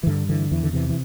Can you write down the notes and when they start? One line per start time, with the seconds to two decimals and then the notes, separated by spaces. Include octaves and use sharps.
0.03 E3
0.07 G2 D3
0.29 D3 E3
0.51 E2 E3
0.63 D3
0.73 C3 E3
0.89 E3